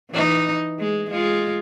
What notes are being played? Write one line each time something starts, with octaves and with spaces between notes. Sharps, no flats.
E3 D#4
G#3
G#3 F4